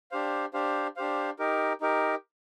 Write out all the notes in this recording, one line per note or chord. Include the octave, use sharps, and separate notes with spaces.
D4 G4 C5 F5
D4 G4 C5 F5
D4 G4 C5 F5
D#4 G4 A#4
D#4 G4 A#4